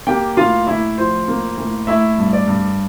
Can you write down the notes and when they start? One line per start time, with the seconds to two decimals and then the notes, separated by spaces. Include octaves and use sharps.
0.07 A#3 G4 G5
0.37 A2 F4 F5
0.67 A2 E4 E5
0.97 F3 C5
1.28 A#3
1.58 A2
1.87 A3 E4 E5
2.18 G2
2.33 D5
2.47 G2